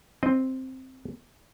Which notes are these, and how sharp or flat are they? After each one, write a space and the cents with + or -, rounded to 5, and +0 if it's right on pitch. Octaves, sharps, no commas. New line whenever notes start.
C4 +0 D#5 -15